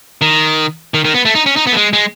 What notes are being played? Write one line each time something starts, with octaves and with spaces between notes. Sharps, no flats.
D#3
D#3
D#3
B3
A3
D#4
C#4
D#4
B3
A3
G#3
G#3